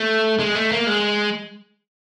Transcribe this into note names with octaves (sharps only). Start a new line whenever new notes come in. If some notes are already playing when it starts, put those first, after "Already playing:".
Already playing: A3
G#3
A3
A#3
G#3